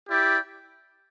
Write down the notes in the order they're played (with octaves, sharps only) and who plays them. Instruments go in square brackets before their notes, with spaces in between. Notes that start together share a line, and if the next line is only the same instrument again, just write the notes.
[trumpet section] E4 G4 D5 G5